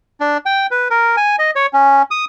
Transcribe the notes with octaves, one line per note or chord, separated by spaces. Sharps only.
D4
G5
B4
A#4
G#5
D#5
C#5
C#4
D#6